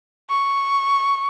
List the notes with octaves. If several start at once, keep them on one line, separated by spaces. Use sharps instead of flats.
C#6